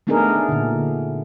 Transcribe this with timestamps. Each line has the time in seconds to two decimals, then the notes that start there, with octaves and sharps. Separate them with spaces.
0.07 A3 B3 D4 D#4 G#4 A#4
0.49 A#2 D3